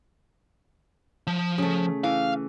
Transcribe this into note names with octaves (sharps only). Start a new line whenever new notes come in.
F3
C#3 A3
E3 F5